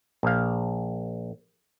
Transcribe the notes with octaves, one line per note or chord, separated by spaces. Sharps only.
A#1 F5